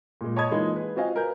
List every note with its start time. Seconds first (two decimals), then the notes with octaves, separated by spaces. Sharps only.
0.21 A#2 G#3
0.36 C#5 D#5 A5 B5 D#6 G#6
0.51 E3 G#3 A#3 D#4 F4
0.74 G#4 B4
0.96 C4 F4 F#4 D#5 F5 G#5
1.16 A#4 B4 G#5 G6